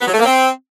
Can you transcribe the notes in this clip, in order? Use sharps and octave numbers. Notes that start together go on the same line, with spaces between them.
B3
F#3
A3
A#3
C4